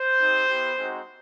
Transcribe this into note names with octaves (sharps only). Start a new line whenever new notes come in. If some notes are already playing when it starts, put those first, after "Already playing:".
Already playing: C5
C4 D#4 G4
B3 E4 G4
G#3 C4 D#4 F#4